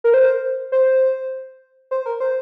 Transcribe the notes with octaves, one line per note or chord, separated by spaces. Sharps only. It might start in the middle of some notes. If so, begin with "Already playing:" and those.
A#4
C5
C5
C5
A#4
C5